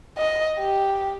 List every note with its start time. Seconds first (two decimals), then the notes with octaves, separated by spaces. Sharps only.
0.18 D#5
0.60 G4